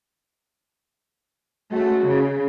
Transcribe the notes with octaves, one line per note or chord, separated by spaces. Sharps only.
G#3 A3 C#4 F#4
C#3